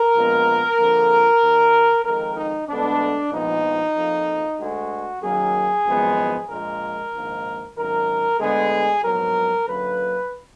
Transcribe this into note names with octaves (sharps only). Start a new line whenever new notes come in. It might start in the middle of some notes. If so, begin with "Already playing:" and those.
Already playing: A#4
A#1 A#2 G#3 B3
F2 D3 F3 A#3
D#2 D#3 A#3
F2 D#3 G#3 A#4
D#4
D2 D3 G#3 B3 D4
A#1 A#2 F3 G#3 B3 D#4
F2 F3 A#3
D2 D3 G#3 F#4
F#2 D#3 F#3 A#3 G#4
G#1 F#2 F3 G#3 B3
A#1 A#2 G#3 A#4
A#1 G#2 D#3 A#3
G#1 F#2 D#3 A#4
D2 D3 G#3 B3 G#4
A#1 G#2 F#3 B3 A#4
F#2 D3 F#3 A#3 B4